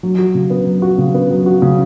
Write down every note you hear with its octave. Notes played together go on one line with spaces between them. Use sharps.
F#3
F#4
C#3
B3
F#3
F#4
C#3
B3
F#3
F#4
C#3